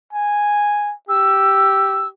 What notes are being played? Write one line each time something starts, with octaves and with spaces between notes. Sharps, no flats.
G#5
G4 E6